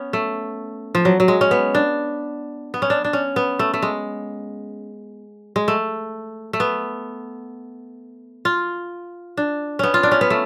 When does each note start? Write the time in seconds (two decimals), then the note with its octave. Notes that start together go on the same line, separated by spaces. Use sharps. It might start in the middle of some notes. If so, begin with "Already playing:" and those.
Already playing: B3 C#4
0.13 A3
0.95 F3
1.05 F#3
1.20 F#3
1.28 G#3
1.41 C#4
1.51 B3
1.75 D4
2.74 B3
2.82 C#4
2.90 D4
3.04 D4
3.13 C#4
3.36 B3
3.59 A3
3.74 A3
3.82 G#3
5.56 G#3
5.68 A3
6.53 A3
6.60 B3
8.45 F4
9.37 D4
9.79 B3 C#4
9.94 F4
10.03 D4
10.11 C#4
10.21 B3
10.30 A3